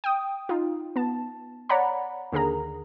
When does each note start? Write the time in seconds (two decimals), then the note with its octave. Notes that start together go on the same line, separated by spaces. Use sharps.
0.04 G5 D#6
0.49 D#4 F4
0.96 B3 A5
1.69 C#5 D5 F#5 A#5 B5
2.32 D#2 D3 G#4 A#4 A#5